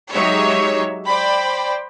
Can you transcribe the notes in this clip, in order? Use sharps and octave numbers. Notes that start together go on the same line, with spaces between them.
F#3 G#3 D#4 G4 C#5 E5
C5 D5 G5 B5